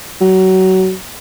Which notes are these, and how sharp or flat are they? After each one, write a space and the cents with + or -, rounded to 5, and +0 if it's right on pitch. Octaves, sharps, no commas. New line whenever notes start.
F#3 +25